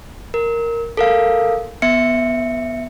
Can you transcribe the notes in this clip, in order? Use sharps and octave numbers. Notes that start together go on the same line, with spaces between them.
A#4
A4 A#4 F5
B3 E5 C#7